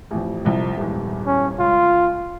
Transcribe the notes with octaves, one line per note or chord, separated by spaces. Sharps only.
A1 F2
C2 F2
D#1 G#1 E2
C#4
C#2 F4